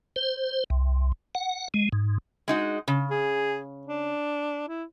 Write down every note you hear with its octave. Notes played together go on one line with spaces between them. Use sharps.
C5
C2
F#5
G#3
G#2
G#3 D#4 F#4
C#3
G#4
D4
E4